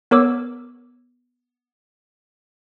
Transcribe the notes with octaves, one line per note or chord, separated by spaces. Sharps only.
B3 A#4 C#5 D6 E6